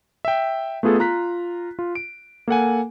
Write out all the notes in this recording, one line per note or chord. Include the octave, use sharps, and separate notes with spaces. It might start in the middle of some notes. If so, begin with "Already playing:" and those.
E5 G5
A3 B3 F4 G#4 A4
F4 A#5 F#6 B6
F4
D7
A#3 A4 F#5 G#5